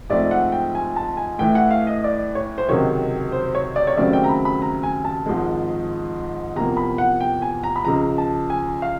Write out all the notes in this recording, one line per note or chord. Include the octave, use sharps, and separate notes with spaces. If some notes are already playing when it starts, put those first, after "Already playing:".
G#2 F3 A3 C4 D5
F#5
G5
G#5
A5
G#5
A2 E3 A3 G5
F#5
F5
D#5
D5
C#5
C5
C#2 C3 D#3 F#3 C#5
C5
C#5
D5
C#5
D#2 C#3 F#3 A3 C4 D5
G5
A#5
B5
B5
A#5
G#5
A5
G#1 G#2 F3 G#3
E2 C3 F3 A#3 A#5
B5
F#5
G5
G#5
A#5
B5
C#2 C#3 F3 A#5
A5
G#5
F5